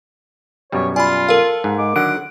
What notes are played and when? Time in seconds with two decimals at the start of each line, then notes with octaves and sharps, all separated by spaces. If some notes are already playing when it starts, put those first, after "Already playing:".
0.72 F#2 B2 G3 C#5
0.96 F4 D5 G#5 B5
1.29 A4 A#4 F5
1.64 G#2
1.78 G#3 D6
1.96 D3 D#3 F#3 F#5 D7